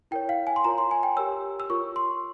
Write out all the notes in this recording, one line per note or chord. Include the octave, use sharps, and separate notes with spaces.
E4 A#4 C#5 G5
F5
G#5
C6
F4 A#4 C#5 A#5
C6
G#5
G5
G4 A#4 C#5 E6
E6
F4 A#4 C#5 C#6
C6